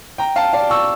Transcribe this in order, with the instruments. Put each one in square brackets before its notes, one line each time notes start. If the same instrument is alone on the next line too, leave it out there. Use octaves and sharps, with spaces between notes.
[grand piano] G5 A#5
F5 A5
D5 F5
C#6 E6